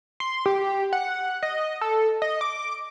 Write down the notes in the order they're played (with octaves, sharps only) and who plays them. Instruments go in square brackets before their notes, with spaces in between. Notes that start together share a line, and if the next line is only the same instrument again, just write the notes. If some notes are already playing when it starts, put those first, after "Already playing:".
[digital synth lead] C6
G4
F#5
D#5
A4
D#5
D6